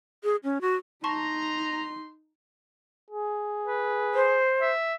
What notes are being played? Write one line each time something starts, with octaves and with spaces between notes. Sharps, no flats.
G#4
C#4
F#4
D#4 A5 A#5 C6 C#6
G#4
B4
C5
E5